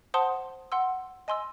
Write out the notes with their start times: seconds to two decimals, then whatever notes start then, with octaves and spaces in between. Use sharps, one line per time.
0.14 C5 F#5 A5 C6 D#6
0.72 F#5 C6 E6
1.28 D#5 G#5 C6 E6